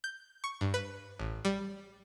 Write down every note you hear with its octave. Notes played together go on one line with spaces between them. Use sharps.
G6
C#6
G2
B4
A1
G3